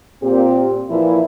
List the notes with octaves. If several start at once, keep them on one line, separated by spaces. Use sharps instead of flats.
A#2 C4 G4
A#2 E3 F3 E4